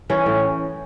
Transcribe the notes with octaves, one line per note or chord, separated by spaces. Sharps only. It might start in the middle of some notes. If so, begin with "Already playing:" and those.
E3 C#4
A2